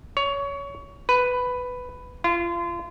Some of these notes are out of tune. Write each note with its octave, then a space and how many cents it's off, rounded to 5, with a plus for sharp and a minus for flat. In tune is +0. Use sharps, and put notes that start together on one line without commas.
C#5 +20
B4 +10
F4 -30